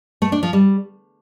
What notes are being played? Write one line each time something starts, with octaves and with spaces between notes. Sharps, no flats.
A3
D4
F3
G3